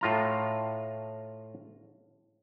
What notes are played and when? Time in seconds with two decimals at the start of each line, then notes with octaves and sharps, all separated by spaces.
0.01 A2 F4 A#5